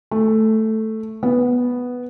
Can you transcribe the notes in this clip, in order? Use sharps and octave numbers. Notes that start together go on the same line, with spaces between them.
A3
B3